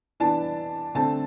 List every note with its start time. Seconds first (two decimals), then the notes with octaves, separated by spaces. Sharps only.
0.20 E3 B3 D4 A5
0.95 D3 A3 C4 A5